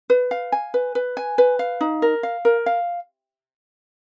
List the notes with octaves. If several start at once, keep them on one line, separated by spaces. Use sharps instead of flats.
B4
F5
G#5
B4
B4
G#5
B4
F5
D#4
A#4
F5
A#4
F5